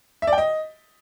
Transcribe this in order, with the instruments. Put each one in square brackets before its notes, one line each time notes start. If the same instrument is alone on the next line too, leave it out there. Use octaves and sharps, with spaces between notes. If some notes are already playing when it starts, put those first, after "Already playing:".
[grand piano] E5
D5
G5
D#5